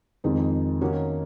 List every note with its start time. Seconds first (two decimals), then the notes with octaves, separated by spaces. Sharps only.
0.24 F2 D#3 G#3 C4
0.81 D#3 A#3 C#4 F#4